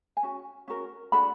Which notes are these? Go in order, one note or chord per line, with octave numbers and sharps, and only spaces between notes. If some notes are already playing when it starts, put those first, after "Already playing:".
G#5
C#4 F#4
C#4 F#4 A#4
D4 F#4 A4 B5